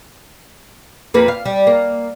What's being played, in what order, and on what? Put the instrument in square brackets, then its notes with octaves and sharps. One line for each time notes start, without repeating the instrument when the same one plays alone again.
[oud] F2 A#3 B4
F5
G3
A#3